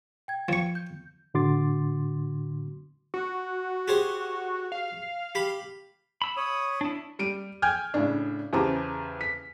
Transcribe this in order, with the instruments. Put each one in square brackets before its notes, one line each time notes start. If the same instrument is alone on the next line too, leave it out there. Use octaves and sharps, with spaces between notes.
[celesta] G5 G#6
[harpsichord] F3 C#6
[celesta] G6
[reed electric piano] A2 D3 F#4 C6 D6 A6
[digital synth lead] F#4
[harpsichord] G4 G#4 C5
[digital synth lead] F5
[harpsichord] G4 B5
[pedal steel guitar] B5 E6
[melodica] C#5 D#6
[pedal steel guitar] D4 E4
[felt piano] G3 D7 D#7
G5 G#5 F6 G6 G#6
A2 C#3 D4
E2 C#3 G4 C5 A5 A#5
B6